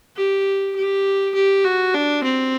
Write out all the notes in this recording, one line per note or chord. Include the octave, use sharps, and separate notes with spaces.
G4
G4
G4
F#4
D4
C4